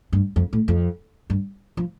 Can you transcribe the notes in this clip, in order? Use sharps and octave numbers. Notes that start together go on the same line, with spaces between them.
G2
F2
A2
F2
G2
F3